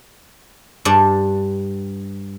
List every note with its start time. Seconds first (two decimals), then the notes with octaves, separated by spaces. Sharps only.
0.85 G2 D4 D5